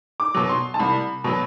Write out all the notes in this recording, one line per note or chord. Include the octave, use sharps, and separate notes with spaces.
D6
B2 F#3
C6
A5
C2 B5
B2 F#3